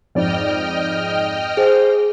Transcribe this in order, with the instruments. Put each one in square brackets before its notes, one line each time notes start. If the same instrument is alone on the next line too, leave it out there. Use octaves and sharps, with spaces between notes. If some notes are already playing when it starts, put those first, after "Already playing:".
[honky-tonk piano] F2 G#2 D5 [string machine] D#5 G5 F6
[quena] G#4
[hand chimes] G#4 [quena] C5